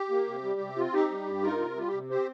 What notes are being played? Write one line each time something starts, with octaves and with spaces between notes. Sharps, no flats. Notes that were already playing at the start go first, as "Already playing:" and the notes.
Already playing: G4
A#3
C3
G3
C3
C4 F4
D#4 G4
G3
G2
D#4 F4 A#4
C3
G3 F4
G4
C3
C4 G4 C5